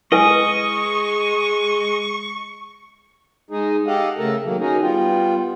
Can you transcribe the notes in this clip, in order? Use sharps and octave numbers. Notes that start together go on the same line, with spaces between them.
G#3 E4 B4 D#5 G#5 C#6
G#3 D#4 G#4
G4 A4 D#5 F5 F#5
C#3 A3 A4 A#4
D#3 F#3 A#3
C#4 D#4 F#4 G#4 A#4
G3 B3 F4 G5